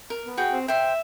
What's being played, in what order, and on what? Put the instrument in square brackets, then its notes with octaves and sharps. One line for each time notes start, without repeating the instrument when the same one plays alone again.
[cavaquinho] A#4
[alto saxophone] B3
[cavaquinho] F#4 G#4 G5
[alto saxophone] C4
[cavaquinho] C5 G5 [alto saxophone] E5